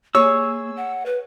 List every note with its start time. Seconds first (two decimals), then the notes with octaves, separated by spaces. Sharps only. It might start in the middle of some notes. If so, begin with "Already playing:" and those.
0.15 A#3 G#4 C#5 E6
0.77 F#5
1.06 B4